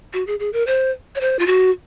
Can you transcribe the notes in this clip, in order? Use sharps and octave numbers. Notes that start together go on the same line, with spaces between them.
F#4
G#4
G#4
A#4
C5
C#5
C5
F4
F#4